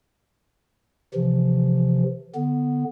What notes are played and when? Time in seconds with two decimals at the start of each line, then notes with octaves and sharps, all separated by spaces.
1.14 C3 E3 F3
2.35 D3 B3